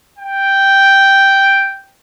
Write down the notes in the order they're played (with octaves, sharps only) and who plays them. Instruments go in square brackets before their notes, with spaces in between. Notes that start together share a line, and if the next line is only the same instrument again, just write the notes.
[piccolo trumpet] G5